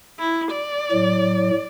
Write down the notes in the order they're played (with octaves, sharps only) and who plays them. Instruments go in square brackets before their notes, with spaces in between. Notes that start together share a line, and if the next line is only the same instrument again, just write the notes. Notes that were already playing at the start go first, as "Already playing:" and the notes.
[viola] E4
D5
[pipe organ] A2 F#3